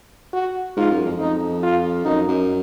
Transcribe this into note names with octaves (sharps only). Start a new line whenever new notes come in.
F#4
G#2 F4
F#2
F2
F2 D#4
F4
F#2 D#4
F#2